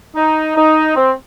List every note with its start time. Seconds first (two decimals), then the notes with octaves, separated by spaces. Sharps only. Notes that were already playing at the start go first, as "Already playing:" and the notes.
0.16 D#4
0.56 D#4
0.96 C4